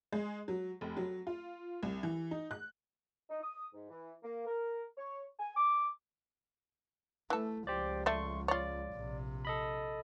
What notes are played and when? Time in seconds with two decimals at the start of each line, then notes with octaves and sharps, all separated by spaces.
0.13 G#3
0.48 F#3
0.81 F1
0.97 F#3
1.27 F4
1.83 C2
2.03 E3
2.31 D#4
2.51 F#6
3.30 D#4
3.42 D#6
3.74 G#2
3.90 E3
4.24 A#3
4.47 A#4
4.98 C#5
5.40 G#5
5.57 D6
7.30 E3 A3 A4
7.67 C#2 F3 G4 C5 D5
8.06 A3 D5 E5 C6 C#6
8.48 F4 C#5 D5
8.94 A#1 C3
9.45 A4 D#5 B5